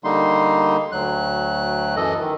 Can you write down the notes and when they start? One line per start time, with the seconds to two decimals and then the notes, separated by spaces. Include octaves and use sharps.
0.04 D3 G3 A#3 D#4 C6
0.92 D2 F#3 F#6
1.96 F#2 E3 A4 D#5
2.21 D#3